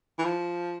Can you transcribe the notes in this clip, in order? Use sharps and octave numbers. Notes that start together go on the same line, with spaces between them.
E3
F3